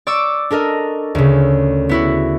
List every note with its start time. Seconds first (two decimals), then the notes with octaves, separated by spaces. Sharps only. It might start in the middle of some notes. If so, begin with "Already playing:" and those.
0.07 D5 C#6 D6 E6
0.51 D4 A4 A#4 D#5
1.15 D2 C#3
1.89 B3 E4 F#4